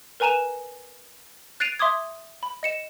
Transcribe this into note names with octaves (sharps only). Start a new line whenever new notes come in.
A#4 B4 G#5 A#5 D#7 E7
F#6 A6 C7 D7 D#7 F7
E5 C6 D6 D#6 G#6
B5
D#5 C#7 E7